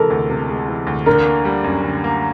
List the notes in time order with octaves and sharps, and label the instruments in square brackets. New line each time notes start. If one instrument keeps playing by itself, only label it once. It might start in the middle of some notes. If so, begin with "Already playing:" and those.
Already playing: [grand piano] C3 E3 G#3 [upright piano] A4 A#4
[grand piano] D2
C3
G#3
E3
D2
[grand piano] D3 [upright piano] A#4
[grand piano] A#3
G3
F#2
D3
A#3